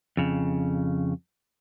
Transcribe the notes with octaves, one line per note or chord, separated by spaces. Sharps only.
F2 C#3